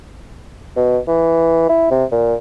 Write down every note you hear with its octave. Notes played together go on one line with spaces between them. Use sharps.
B2
E3
E4
C3
A#2